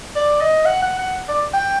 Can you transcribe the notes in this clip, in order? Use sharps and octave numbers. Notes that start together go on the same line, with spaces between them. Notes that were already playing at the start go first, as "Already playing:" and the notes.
D5
D#5
F#5
F#5
F#5
D5
G5